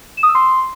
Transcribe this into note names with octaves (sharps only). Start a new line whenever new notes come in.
E7
D#6
E6
C6